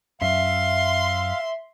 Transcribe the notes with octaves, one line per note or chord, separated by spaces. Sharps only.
F#2 F#3 E5 F5 C6